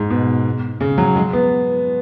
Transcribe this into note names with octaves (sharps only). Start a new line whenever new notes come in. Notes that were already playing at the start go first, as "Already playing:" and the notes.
Already playing: G#2
B2
C#3
F#3
G#3
B3